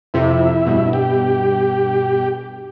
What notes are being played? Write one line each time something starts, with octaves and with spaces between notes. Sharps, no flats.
F2 C3 E4
G2 B2
G4